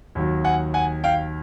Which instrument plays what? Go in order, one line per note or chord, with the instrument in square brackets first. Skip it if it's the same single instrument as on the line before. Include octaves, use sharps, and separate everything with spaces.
[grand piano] D#2 D#3 F#3
F#5 G#5
F#5 G#5
F5 G5